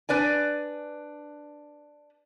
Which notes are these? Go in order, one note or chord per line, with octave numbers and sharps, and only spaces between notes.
D4 B4 D5 G#5